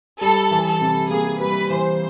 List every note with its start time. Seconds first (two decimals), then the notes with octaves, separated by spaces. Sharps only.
0.21 G3 A4
0.51 E3
0.66 A4
0.81 C3
1.10 A#3 G#4
1.40 G3 B4
1.70 E3 C5